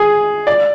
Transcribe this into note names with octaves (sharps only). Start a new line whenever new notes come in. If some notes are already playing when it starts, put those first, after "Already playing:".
Already playing: G#4
D5